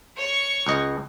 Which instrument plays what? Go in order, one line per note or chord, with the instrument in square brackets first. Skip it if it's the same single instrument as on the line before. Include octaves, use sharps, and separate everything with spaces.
[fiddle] C#5 C#6
[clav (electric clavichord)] C#2 D#5